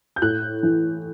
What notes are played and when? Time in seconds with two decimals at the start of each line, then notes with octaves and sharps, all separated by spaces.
0.16 G6
0.22 A2 F#6
0.63 E3